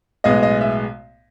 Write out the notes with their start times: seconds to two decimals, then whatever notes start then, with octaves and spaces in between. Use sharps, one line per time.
0.24 B1 A2 G#3 B3 D#5
0.43 D#5
0.61 E5